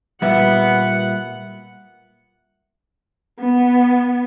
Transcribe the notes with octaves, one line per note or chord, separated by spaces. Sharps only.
A#2 G3 B3 E5 F#5
B3